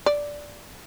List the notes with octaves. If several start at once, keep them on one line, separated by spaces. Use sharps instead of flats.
D5